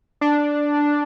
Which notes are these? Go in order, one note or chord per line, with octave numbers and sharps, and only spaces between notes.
D4